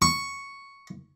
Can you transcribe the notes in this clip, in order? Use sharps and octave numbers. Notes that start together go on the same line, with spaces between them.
C#6